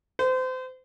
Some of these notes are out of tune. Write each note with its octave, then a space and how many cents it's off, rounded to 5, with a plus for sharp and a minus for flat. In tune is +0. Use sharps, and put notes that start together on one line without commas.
C5 -30